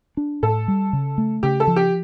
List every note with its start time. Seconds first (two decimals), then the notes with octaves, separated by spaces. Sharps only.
0.17 D4
0.43 A2 A4
0.68 G3
0.93 C#3
1.18 A3
1.43 C#3 G4
1.60 A4
1.67 F3
1.76 G4